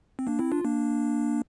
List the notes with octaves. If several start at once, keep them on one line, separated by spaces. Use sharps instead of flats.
C4
A#3 D4
C4 E4
D4 F4
A#3 D4